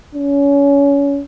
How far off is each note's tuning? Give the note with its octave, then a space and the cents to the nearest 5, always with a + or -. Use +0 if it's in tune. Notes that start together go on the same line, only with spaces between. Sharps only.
C#4 +25